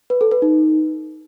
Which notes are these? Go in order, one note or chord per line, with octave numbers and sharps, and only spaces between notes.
B4
A4
B4
D#4